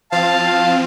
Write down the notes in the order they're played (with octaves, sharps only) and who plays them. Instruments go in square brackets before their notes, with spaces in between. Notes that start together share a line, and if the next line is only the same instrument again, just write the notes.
[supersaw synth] F3 C4 F4 [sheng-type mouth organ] F5 A5